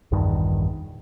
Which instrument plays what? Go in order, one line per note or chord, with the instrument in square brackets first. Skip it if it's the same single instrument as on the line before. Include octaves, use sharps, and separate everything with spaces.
[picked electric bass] A#1 E2 G2 D#3